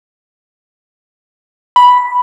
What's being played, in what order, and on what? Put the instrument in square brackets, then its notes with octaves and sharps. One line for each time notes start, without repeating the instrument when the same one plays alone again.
[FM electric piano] B5